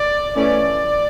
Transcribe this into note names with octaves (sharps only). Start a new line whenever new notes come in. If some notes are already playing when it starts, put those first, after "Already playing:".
Already playing: D5
E3 A3 C#4 D5